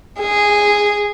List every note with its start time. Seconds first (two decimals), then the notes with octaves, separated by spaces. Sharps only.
0.19 G#4